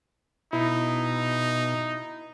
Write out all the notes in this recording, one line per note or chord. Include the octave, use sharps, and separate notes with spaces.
B2 D#4 E4